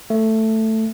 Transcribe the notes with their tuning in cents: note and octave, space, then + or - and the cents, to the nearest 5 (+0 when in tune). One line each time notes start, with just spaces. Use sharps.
A3 +5